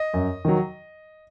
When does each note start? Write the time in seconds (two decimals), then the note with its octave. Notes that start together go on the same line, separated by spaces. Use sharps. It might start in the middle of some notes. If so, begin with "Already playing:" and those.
Already playing: D#5
0.14 F#2
0.45 D#3 F#3